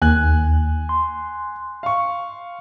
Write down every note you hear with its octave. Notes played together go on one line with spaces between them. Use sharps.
D#2 G#5 F#6
C6
F5 C#6